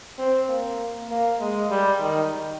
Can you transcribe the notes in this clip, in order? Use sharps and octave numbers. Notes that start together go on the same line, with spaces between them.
C4
A#3
A#3
G#3
G3
D#3